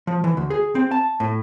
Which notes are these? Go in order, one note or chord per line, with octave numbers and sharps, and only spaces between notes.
F3
E3
D2
G#4
C4
A5
A2